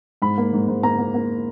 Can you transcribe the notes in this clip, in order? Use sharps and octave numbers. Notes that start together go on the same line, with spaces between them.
G#2 B5
A#3
G#2
G#2
A#3 A#5
A#3
A#3